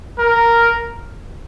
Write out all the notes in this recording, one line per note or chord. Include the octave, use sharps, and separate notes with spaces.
A#4